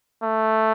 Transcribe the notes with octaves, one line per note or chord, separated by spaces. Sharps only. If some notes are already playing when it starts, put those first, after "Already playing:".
A3